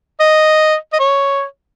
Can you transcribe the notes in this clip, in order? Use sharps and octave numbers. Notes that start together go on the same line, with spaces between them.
D#5
D#5
C#5